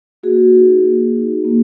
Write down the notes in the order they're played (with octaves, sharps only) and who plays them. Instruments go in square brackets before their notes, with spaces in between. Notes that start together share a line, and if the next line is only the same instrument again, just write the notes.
[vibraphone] A#3 F#4 G#4
D#4 F#4
A#3
D#4 F#4
A#3